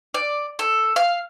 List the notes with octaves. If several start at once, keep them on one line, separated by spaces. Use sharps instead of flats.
D5
A4
F5